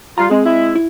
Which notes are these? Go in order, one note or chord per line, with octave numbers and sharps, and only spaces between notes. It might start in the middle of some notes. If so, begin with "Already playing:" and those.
G3 F4 A#5
G#3 C4 G#4
G#3 E4
E4